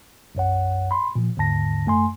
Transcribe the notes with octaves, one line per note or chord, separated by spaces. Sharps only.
B1 F#2 C#5 F#5
B5 C6
A#2 F3
D#2 G#2 D3 A5 A#6
F#2 A3 G#5 C6